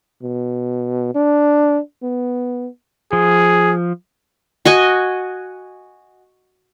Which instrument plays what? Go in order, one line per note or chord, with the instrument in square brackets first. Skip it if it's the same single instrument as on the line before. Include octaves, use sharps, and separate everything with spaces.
[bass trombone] B2
D4
B3
[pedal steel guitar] F3 [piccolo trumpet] G#4
[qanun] F#4 D#5 G#5